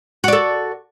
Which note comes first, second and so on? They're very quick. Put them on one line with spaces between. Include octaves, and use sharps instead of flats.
F#4 D5 A4